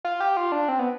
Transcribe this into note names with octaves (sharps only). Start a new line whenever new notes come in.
F4
G4
F4
D4
C4
B3